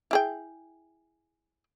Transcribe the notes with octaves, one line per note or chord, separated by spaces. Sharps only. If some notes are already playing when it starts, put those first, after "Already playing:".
E4 G#4 G5